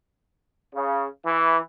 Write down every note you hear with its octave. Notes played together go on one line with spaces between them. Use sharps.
C#3
E3